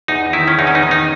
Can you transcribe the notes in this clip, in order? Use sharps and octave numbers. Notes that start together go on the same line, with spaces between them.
E2 D#4
D#3 E4
C#4
E2 D#4
C#4
D#4
D#3
D#4